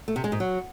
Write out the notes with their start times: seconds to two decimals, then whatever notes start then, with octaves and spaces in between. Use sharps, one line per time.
0.08 A3
0.16 C3
0.24 G#3
0.32 G#2
0.40 F#3